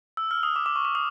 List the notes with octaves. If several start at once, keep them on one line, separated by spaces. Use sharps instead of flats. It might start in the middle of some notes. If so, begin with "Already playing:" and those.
E6
F6
D#6
D6
D6
C#6
D6
D#6